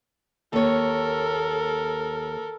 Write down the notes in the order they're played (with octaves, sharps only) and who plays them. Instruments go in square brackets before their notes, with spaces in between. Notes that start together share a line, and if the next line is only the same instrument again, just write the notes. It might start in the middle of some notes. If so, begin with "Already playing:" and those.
[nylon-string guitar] D#2 C#5 [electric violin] A4 A#4